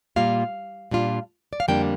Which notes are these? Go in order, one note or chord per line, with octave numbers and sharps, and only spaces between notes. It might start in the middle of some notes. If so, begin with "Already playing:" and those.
A#2 G3 A#3 F4 F5
A#2 G3 D4 F4
D5
F5
F2 D3 G3 A#3 D4 G5